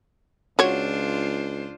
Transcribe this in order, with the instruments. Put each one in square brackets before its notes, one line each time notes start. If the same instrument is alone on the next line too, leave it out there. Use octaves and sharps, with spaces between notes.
[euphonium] C#2 [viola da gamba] D4 F4 C5 [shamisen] F#4 C#5